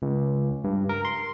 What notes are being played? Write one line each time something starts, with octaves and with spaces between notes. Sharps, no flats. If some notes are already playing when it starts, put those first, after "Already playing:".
C#2
G2
A#4
C6